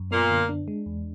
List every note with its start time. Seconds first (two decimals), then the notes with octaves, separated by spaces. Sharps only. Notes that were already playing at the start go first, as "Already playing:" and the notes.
Already playing: F#2
0.11 A#2 A#3 B3
0.30 D3
0.49 D4
0.68 G#3
0.86 E2